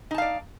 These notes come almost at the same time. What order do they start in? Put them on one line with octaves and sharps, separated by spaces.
D#4 A5 F5 D5